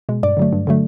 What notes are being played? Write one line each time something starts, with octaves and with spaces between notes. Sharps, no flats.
B2 G#3
G2 D5
D3 F#3 A3
G2
D3 F#3 A3